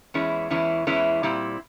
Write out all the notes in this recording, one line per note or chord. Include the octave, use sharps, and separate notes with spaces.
E2 E3 G#3 C#4 E4
E2 E3 G#3 C#4 E4
E2 E3 G#3 C#4 E4
A#2 G3 C4 E4